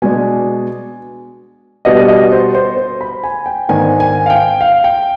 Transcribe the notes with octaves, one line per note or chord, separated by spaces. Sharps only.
B2 G#3 D4 G#5
B2 G3 B3 D4 D#5
D#5
C5
C5
C5
B5
G#5
G5
G#2 D#3 B3 D4 G#5
G#5
F5
G5
F5
G5